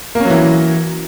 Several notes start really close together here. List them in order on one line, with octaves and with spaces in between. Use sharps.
A#3 C#4 F#3 E3